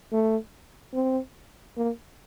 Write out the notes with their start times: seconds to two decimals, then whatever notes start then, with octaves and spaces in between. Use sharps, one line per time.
0.12 A3
0.94 C4
1.77 A#3